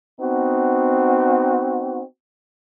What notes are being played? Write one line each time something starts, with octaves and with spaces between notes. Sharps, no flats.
B3 C4 D#4 F#4